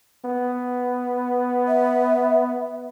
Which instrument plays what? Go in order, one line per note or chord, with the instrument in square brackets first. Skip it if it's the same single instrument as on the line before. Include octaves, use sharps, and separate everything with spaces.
[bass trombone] B3
[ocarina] E5